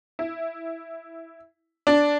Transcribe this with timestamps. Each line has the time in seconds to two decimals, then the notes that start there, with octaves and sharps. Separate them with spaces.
0.19 E4
1.87 D4